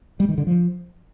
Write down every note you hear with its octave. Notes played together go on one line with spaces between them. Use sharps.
G3
D#3
D3
F3